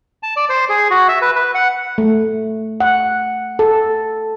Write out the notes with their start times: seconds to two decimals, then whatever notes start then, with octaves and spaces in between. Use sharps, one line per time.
0.23 A5
0.36 D5
0.49 C5
0.69 G#4
0.91 F#4
1.08 E5
1.22 B4
1.36 B4
1.55 F#5
1.98 A3
2.80 F#5
3.59 A4